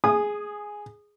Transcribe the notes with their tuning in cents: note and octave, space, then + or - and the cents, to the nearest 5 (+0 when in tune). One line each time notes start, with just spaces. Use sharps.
G#4 +0 D#6 -20